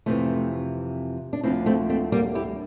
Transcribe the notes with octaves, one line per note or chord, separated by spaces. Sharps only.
F2 C3 E3 A3 C4
D4
D2 D3 F3 C4 E4
A3 C4
A3 C4
G3 A#3
E4 G4